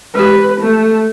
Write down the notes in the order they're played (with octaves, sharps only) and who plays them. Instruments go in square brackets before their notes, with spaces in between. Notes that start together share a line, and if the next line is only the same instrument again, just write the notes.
[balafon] G#3 G4 [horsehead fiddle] B4
[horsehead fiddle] A3